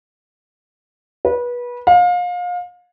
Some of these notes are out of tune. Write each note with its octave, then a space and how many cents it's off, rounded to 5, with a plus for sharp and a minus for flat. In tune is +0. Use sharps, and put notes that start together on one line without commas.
B4 -25
F5 +30